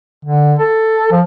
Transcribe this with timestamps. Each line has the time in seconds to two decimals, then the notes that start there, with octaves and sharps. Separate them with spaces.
0.25 D3
0.59 A4
1.12 F3